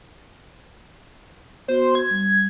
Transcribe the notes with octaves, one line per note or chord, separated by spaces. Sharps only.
B3 F#4 C5
G#6
G3